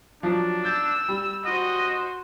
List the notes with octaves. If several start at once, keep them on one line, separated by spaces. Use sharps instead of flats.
F3 F#3 D4
E6 G6 A6
G3
F#4 C5 D#5